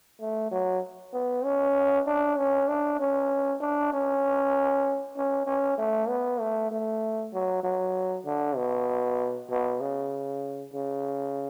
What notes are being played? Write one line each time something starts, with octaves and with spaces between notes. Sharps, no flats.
A3
F#3
B3
C#4
D4
C#4
D4
C#4
D4
C#4
C#4
C#4
A3
B3
A3
A3
F#3
F#3
D3
B2
B2
C#3
C#3